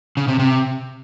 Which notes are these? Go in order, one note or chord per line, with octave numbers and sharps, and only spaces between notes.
C#3
C3
C3